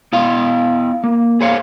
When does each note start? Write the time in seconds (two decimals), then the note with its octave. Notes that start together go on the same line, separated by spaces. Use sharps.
0.13 B3 E4 F5
1.04 A#3
1.41 G#4 C5 C#5 F5